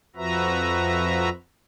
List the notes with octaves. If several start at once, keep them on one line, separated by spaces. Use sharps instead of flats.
F2 F3 F#4 B4 E5 A#5